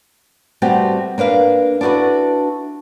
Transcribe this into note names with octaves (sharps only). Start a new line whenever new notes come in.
G3 A3 B3 C4 F#4 G4
A#3 D4 B4 F5
D4 E4 F#4 A4 B4